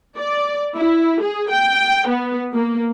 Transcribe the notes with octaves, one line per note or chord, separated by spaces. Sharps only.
D5
E4
G#4
G5
B3
A#3